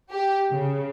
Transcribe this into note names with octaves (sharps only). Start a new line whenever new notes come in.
G4
C#3